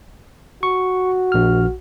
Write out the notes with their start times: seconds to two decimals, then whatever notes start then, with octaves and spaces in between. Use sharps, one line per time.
0.63 F#4 C#6
1.32 A#1 F6